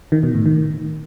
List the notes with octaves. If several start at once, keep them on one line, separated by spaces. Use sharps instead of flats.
D#3
B2
A2
D#3